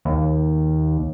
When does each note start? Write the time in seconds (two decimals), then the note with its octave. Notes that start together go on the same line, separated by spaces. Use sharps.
0.05 D#2